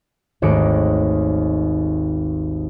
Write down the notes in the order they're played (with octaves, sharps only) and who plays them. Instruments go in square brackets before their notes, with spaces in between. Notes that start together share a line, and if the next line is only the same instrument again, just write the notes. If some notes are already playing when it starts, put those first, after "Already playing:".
[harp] G#1 D#2 A3 D6 C#7